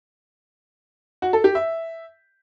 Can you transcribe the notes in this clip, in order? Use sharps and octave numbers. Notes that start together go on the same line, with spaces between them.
F#4
A4
G4
E5